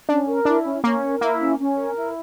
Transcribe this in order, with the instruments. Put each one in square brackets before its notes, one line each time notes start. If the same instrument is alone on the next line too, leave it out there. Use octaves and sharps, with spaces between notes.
[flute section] C#4 [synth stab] D4
[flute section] A#4
[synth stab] D4 [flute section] E4
[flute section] C#4
[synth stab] A#3 [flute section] C#4
[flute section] A#4
[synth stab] A#3 [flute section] E4
[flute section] C#4
C#4
A#4
E4